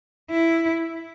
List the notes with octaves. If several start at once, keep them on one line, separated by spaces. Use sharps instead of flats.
E4